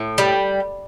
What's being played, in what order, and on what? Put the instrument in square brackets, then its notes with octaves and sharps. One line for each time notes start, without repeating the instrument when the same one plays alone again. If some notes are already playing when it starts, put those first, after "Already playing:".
Already playing: [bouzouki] A2
G3